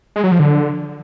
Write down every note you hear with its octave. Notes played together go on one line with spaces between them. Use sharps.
G#3
F#3
F3
D3